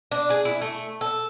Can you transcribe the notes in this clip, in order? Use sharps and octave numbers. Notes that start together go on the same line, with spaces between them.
D4
G#4
E4
A3
A4